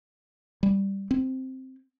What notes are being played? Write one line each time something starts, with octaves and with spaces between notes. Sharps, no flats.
G3
C4